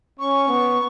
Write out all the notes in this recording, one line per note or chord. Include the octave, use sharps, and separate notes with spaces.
C#4 C#6
B3